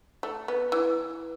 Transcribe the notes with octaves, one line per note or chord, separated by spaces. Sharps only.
A3
B3
E3